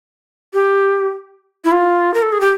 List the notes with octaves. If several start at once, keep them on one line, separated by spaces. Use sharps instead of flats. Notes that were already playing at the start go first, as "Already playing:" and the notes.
G4
E4
F4
A#4
A4
G#4
G4